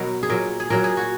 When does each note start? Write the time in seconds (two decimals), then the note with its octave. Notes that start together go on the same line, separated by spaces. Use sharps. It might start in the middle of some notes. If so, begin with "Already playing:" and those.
Already playing: B2 F#3 A#4
0.23 G#4
0.29 A#2 F#3 A#4
0.60 G#4
0.70 A#2 F#3 A#4
0.84 G#4
0.97 F#4